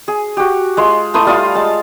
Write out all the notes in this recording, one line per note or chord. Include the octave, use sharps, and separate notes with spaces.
G#4
F#4 G4
G#3 F4 C6
A3 E4 C5 D#6
G3 F4 F5 D#6
G#3 A5